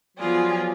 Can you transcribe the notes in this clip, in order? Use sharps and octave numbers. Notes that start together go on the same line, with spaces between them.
F3 F#3 B3 F4 G#4 D5